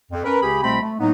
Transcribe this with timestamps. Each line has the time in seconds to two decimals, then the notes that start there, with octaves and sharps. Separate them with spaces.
0.12 F2
0.24 C#4 A#4 B4
0.42 C#2 C#3 G4 G#4 G#5 B5
0.62 C2 B2 A3 C4 C5 B5
0.82 A3
0.99 A2 F#3 A#3 B3 D#4